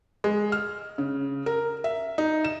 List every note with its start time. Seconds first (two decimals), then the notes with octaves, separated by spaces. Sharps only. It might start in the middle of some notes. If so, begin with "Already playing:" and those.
0.24 G#3
0.52 F6
0.98 C#3
1.46 A#4
1.84 E5
2.18 D#4
2.44 E7